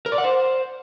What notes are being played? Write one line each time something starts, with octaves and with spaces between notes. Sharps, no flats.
A#4
D5
F#5
C5